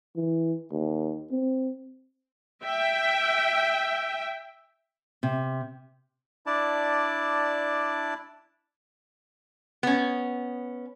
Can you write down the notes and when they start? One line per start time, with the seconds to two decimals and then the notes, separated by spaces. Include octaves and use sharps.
0.16 E3
0.72 D#2
1.31 C4
2.64 E5 G5
5.23 C3
6.46 D4 E4 D5 A5
9.83 B3 C#4